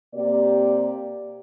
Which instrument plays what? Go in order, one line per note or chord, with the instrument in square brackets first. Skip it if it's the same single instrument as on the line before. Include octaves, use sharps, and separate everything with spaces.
[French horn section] C3 A#3 G4 D5